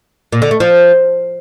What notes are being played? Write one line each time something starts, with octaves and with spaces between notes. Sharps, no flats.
A#2
D3
A3
F3